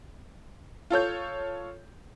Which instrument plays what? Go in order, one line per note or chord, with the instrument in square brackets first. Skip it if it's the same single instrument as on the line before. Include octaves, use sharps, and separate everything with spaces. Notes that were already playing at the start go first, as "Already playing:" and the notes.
[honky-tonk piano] F4 A4 C#5 G6